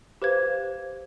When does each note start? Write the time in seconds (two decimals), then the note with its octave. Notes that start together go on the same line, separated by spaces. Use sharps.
0.22 G4 B4 C5 F5 G#6